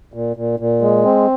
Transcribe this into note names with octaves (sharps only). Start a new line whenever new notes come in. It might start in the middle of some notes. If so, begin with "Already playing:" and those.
A#2
A#2
A#2
G#3
C4